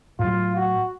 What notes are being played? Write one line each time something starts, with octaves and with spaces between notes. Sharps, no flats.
A2 F#3 F4
F#4